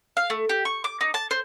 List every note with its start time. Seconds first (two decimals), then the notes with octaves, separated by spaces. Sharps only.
0.17 F5
0.30 A3
0.49 G4
0.65 C#6
0.84 D6
1.01 D#4
1.14 A5
1.31 C5